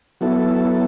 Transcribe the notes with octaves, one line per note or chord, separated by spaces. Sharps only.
F#3 B3 E4 A4